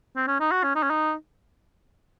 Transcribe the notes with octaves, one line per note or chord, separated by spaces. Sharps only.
C4
C#4
D#4
F#4
C#4
D#4
C#4
D#4